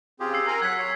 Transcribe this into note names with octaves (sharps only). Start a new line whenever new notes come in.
C#3 C4 F4 G4 G#4
E6 C7
A#4 G#5 A#5
F#3 F#5 F#6 G#6 B6
C#5